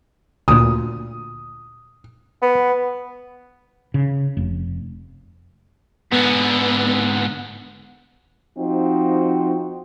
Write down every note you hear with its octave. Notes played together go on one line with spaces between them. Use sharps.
D2 A#2 D#6
B3
C#3
F1
G#2 D3 B3
F3 C4 D#4 F#4